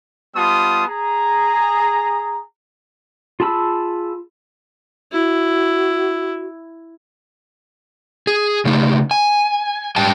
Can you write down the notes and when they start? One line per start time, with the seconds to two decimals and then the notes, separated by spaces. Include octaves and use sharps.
0.35 G3 B3 F4 A5 C6 D#6
0.89 G#4 A#5
3.40 F4 G#4 A5 B5 E6
5.13 E4 F#4
8.27 G#4
8.65 C#3 A3 D#4
9.11 G#5
9.96 G#2 G3 G5 A5